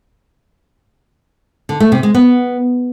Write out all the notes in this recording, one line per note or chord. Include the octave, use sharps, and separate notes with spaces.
D3
A3
C3
G#3
B3